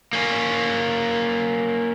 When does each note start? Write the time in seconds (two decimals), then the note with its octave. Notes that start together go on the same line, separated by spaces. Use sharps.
0.13 A#3 C#4